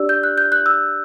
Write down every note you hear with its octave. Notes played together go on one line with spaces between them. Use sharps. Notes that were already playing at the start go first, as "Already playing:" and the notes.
Already playing: D4 G4 D5 E6
G6
F#6
G6
F#6
E6